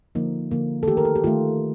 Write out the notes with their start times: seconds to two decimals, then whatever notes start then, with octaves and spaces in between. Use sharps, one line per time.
0.15 D3 F3 A#3 D#4
0.51 D3 F3 A#3
0.83 A4
0.87 D#3 A3 G4
0.97 A#4
1.05 A4
1.15 G4
1.24 D#3 A3 F4